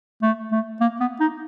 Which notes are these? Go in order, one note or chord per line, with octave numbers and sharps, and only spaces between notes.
A3
A3
A#3
B3
D#4